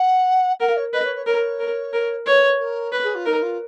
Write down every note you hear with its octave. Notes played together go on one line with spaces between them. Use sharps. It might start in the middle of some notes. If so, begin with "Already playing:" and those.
Already playing: F#5
A#4 F#5
F5
C#5
B4 D#5
C#5
C#5
A#4 C#5
A#4
A#4
B4 C#5
A#4
B4
G#4
F4
D#4 A#4
F4